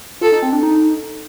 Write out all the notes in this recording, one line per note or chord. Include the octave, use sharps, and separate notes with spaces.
F4 A4
D#4
C4
D4
D#4